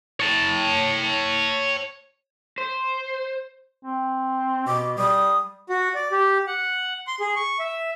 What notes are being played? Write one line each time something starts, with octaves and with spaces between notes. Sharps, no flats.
C#5 A5
C5
C4
B2 D6
G3 D#6
F#4
D5
G4
F#5
C6
G#4
C#6
E5